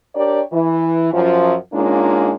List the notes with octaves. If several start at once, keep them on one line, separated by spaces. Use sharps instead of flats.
D4 G4 A#4 C#5 D5
E3
F#2 F3
G#2 G#3 A#3 C#4 D4 F4